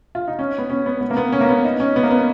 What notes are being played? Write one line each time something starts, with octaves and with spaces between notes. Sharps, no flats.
F4
D#4
C#4
B3
C#4
B3
B3
A#3
B3
C#4
A#3
B3
D#4
C#4
B3
A#3
B3